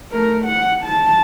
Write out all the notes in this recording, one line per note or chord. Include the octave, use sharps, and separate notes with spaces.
A3 A#4
F#5
A5